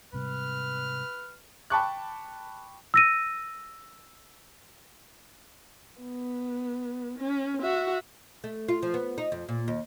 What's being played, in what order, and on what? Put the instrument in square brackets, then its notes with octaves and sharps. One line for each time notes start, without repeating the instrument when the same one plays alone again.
[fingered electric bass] G#2 C3 G3 [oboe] B4 [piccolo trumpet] F6
[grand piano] G5 A5 B5 C#6 D6 F#6
[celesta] E6 A#6 D#7
[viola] B3
C#4
F#4 E5
[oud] A3
F4
F3
B3
D#4
F2
A#2
D#2